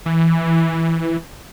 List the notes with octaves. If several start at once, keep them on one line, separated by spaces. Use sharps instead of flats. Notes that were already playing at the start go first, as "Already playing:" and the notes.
E3